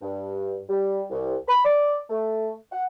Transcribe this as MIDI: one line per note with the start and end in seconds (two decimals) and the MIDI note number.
0.02 0.59 43
0.69 1.02 55
1.10 1.36 36
1.48 1.61 83
1.65 1.98 74
2.10 2.52 57
2.71 2.83 78